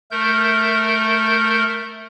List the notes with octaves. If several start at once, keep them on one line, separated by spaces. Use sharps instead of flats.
A3 A#4 G6